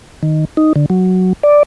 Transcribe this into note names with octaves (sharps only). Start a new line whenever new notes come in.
D#3
D#4
D3
F#3
D5